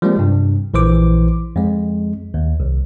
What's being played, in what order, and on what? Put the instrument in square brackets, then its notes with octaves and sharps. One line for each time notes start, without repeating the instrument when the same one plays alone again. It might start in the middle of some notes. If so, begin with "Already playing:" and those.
[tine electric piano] F3 G3 G#3 A#3 C4
G2 C3
A#1 E3 C5 D6
F2 G#3
D#2
C2